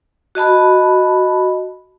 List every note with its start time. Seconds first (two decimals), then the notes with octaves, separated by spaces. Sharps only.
0.35 F#4 D#5 A5 B5